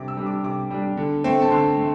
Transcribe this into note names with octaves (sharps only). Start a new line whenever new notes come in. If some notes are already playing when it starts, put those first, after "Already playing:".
Already playing: C3 G3 D4 D6
E6
G3 D4
D6
C3 D6
G3 D4
D3
A3 C4
A5
D3 C6
A3